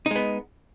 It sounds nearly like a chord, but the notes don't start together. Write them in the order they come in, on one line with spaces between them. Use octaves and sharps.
D#4 G#3 B3